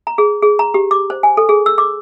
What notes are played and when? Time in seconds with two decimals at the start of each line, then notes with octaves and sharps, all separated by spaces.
0.07 A#5
0.18 G#4
0.42 G#4
0.59 A#5
0.74 G4
0.91 D6
1.10 C5
1.23 G#5
1.37 A4
1.49 G#4
1.66 E6
1.78 D6